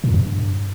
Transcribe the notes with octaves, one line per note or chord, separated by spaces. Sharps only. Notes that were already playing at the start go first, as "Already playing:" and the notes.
A#2
F2
G2